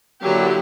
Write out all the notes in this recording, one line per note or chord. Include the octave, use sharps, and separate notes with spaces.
D3 F#3 A#3 E4 G4